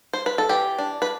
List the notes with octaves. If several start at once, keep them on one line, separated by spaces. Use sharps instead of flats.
C5
B4
A4
E3 G4
D4
B4